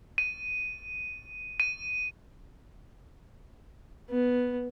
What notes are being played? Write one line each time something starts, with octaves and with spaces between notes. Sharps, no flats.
D#7
D#7
B3